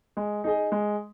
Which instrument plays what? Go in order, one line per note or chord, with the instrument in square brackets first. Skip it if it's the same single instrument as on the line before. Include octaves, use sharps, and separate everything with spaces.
[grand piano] G#3
D#4 G#4 D#5
G#3